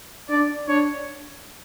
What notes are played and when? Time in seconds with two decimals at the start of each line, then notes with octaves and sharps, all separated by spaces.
0.30 D4 D5
0.68 D4 C#5